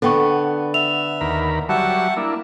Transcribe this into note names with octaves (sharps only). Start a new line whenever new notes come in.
D3 B3 A4 G5 C#6
E5 F7
D#2 A#4 B5
F#3 G3 E5 F#5 A5
A#3 D4 E4